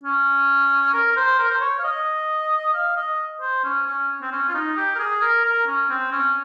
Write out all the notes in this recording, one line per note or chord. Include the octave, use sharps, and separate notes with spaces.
C#4
A#4
C5
A#4
C5
C#5
F5
D#5
F5
D#5
C5
C#4
C#4
C4
C#4
F4
D#4
G4
A#4
G#4
A#4
A#4
C#4
C4
C#4